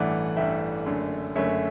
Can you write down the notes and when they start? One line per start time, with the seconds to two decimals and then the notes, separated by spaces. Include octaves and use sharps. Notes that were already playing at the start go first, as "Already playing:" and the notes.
Already playing: A1 G2 E3 A3 D5 F#5
0.37 A1 G2 E3 A3 E5 G5
0.86 F#1 F#2 D3 A3
1.35 F#1 F#2 D3 A3 C#5 E5